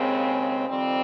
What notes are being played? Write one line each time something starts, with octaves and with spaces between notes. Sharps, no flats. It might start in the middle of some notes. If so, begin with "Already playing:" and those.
Already playing: D#2 C#3 G#3 C4
F2 D#3 G3 C4